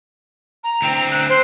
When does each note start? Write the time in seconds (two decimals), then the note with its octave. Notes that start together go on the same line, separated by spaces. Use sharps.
0.64 A#5
0.82 D2 C4
1.11 F#6
1.29 C5